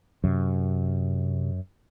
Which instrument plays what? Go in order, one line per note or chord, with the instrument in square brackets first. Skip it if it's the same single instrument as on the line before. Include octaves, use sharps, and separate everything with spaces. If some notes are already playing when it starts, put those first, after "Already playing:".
[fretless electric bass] F#2 [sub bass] C3